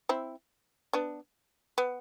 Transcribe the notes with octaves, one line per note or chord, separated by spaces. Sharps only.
C4 E4
B3 D4
B3